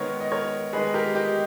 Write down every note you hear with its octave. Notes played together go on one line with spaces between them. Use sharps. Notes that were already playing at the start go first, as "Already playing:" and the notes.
Already playing: D#3 G#3 B3 A#4 C#5
D#5
A#4 C#5
D#3 G#3 B3 G#4 B4
G4 A#4
D#4 G4